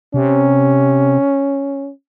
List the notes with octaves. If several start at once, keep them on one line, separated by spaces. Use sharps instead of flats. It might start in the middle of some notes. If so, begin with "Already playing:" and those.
C3 C#4